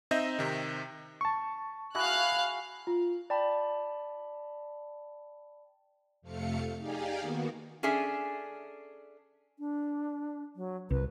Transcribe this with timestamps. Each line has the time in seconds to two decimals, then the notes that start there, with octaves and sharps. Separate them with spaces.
0.11 C4 D#4 D#5 E5 G6 A#6
0.39 C3 D#3
1.21 A5 C#6
1.95 E4 F#4 G#4 F5 F#6
2.87 F4
3.30 D5 G5 A5 B5
6.22 F2 C3 A3 F5 C#7
6.77 D#4 G4 G#4 D5 F5 G#5
7.20 D#3 A#3 B3 F#4
7.83 C#4 D4 G#4 A4 E5
9.59 D4
10.56 F#3
10.91 C2 B4